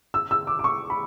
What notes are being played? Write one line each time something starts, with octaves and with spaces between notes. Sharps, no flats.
E6
E6
D6
D6
C#6
B5